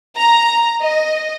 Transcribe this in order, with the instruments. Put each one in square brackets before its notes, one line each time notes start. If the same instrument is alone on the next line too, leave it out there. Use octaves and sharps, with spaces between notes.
[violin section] A#5
D#5